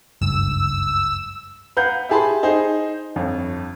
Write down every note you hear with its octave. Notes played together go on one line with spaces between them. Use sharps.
F#1 C#2 G2 E6
B4 F5 F#5 A#5 G6
E4 G4 G#4 A5 B5 C6
D#4 G#4 C5
G1 F2